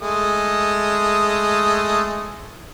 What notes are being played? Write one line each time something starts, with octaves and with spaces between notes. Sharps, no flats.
G#3 A3 D#6